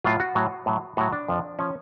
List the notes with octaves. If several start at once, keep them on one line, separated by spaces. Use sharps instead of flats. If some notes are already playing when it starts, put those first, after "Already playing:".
A2 F#3 F4
F#4
A2 F#3
A2 F#3
A2 F#3 F#4
D4
F2 F3
F3 C#4